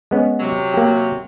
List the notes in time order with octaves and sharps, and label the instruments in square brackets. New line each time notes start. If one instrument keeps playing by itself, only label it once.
[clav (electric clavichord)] G#3 B3 C#4
[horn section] C3 F#3
[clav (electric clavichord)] A#3 G4